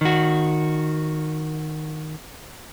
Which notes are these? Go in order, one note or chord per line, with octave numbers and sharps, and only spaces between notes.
D#3 F#4